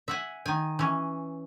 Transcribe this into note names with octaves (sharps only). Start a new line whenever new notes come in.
E5 F#5 G#5
D#3 G#5
E3 C#4